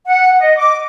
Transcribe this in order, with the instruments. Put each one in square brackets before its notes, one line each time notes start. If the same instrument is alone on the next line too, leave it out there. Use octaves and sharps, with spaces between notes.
[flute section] F#5
D#5
D6